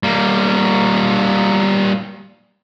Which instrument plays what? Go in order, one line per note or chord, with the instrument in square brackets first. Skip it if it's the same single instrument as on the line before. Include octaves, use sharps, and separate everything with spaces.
[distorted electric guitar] G3 A#3